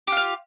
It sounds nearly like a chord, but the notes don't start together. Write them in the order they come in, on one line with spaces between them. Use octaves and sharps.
G4 F4 F5